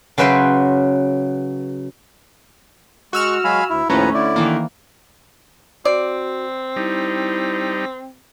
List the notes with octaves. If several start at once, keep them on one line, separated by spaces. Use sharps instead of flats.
C#3 F#3 B4 E5 G5 C6
G#3 F#4 C#6 E6 F6
F#3 G#3 F5 G#5 B5
D2 E4
D#2 A2 F3 A3 C#4 B4 A#5
D3 E4 D5
D#3 E3 A#3
C4 F#4 D5
G3 D#4 E4